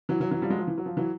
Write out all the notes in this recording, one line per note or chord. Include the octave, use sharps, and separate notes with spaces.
E3 F#3
E3 F#3
E3 F#3
F3 G3
F#3 G#3
F3
E3
F#3
F3
E3 F#3